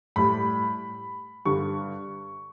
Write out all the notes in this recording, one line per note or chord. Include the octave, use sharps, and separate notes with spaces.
A2 G3 B5
G2 D3 G3 C#6